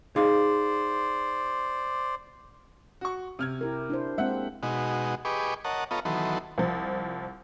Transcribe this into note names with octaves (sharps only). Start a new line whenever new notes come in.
D#4 G#4 C5 D5 F5
F#4 C#6
C3 F6 G#6
E4 G4 A#4
D4 E4 C5
G#3 A#3 C4 E5 F#5 F#6
B2 G#3 D#4 F#4
G4 G#4 B4 D#5 C#6 D6
A#4 C#5 D#5 F#5 A5
B3 F4 A4 C#5 D#5 A#5
D#3 E3 F#3 B3 A4 C6
C2 F3